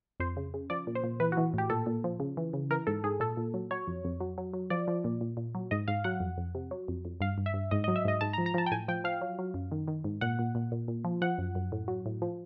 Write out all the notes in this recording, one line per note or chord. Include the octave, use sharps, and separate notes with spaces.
F2 C5
C#3
C#3
F3 D5
A#2
C5
A#2
E3 B4
F#4
E3
A2 G4
A#2 A4
A#2
F3
C#3
E3
C#3
E3 A#4
G#2 A4
G#2 G#4
A#2 A4
A#2
F#3
F#3 C#5
F2
F2
F#3
F#3
F#3
F3 D5
F3
A#2
A#2
A#2
F#3
G#2 D#5
G#2 F5
F#3 F#5
F2
F2
C3
F#3
F2
F2
G2 F5
G2
E5
G2
G#2 D#5
D#5
F#3
E5
G#2 D#5
G#2 A5
A#5
F3
A#5
F3 A5
G5
A2 G#5
F3 G5
F3 F5
F#3
F#3
F#2
D#3
D#3
G#2
A#2 F#5
A#2
A#2
A#2
A#2
F3
F3 F#5
F#2
F#2
A2
F#3
A2
F3